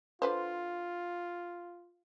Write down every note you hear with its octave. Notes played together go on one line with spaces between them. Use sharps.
D3 F4 B4 C5